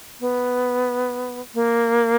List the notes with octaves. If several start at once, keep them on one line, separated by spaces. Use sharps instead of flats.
B3
A#3